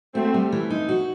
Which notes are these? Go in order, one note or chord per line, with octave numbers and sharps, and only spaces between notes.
A3 C4 F#4
G3
E3 A3
D#4
F#4